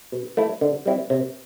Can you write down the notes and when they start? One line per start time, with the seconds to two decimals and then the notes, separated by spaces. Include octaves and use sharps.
0.12 B2
0.37 A3 E4
0.61 D3
0.86 G3 C4 E4
1.10 C3